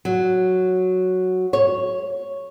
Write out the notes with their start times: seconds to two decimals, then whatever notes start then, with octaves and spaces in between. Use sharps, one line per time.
0.05 F#3
1.53 C#5